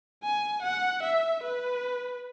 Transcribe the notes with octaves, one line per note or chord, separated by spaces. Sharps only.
G#5
F#5
E5
B4